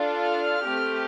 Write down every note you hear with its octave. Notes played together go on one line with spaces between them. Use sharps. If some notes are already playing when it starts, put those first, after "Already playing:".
Already playing: D4 F4 A4
F6
A3 C4 G4